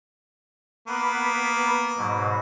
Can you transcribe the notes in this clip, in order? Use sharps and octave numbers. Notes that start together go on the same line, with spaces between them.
A#3 B3 B4
G#2 B2 F#3